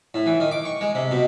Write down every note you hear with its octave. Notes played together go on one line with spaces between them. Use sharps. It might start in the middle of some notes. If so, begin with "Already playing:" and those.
A2
E3
D#3
D6
C#6
G#3
C3
B2